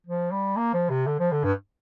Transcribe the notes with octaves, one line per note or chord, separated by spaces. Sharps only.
F3
G3
A#3
F3
C3
D3
F3
D3
G2